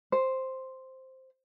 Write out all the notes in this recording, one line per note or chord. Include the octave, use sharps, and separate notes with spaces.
C5